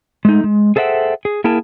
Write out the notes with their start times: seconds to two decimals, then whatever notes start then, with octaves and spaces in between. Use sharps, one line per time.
0.25 G#3 A3 D#4
0.44 G#3
0.76 G#4 A4 C5 E5 F#5 G5
1.25 G#4
1.44 A#3 E4 G#4 A#4 G5 A5